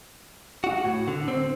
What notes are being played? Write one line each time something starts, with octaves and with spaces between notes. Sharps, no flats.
F#4
A2
D3
C4